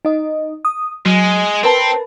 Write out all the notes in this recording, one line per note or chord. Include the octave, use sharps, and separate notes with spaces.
D#4 D#5
D#6
F#3 G#3
C4 A#4 B4 A5